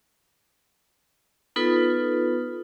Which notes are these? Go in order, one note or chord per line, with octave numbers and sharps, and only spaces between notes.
B3 D#4 F4 A4 B4